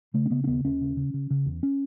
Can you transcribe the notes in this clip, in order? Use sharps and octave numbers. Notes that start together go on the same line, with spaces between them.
C#3 A3
C#4
C#3 B3
C#4
D#2 B3
D#2 C#4
C#3
C#3
C#3
C#3
E2
C#4